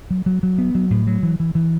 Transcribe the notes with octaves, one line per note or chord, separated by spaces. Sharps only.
F#3
F#3
F#3
B3
F#3
A2
F#3
E3
E3
E3